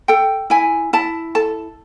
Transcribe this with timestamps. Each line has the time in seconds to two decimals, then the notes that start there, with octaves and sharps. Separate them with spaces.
0.08 A4 G5
0.50 E4 G#5
0.93 E4 A5
1.35 A4 A5